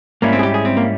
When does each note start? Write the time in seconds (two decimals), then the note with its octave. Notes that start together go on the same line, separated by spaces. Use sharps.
0.22 G#2 G3 A#3 C#4 E4
0.33 C4
0.39 G#4
0.43 G4
0.54 G#4
0.65 C4
0.77 A#3